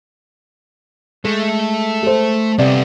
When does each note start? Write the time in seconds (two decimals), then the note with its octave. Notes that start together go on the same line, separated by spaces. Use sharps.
1.25 G#3 A3
2.03 A4 C5
2.59 C3 G3 B3 D5